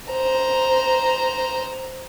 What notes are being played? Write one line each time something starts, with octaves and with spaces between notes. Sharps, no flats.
C5 A#5